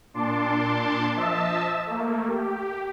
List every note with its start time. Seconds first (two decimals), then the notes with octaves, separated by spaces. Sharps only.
0.14 A#2 D4 A5 C6 D6
1.16 F3 D#5 E5 A5 E6
1.86 A3 A#3
2.27 G4